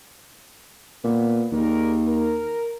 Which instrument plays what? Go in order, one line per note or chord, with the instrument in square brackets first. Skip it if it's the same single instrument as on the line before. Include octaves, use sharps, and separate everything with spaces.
[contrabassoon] A#2 [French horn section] B3
[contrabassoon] D#2 [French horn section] G3 G#4 A#4
[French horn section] A#4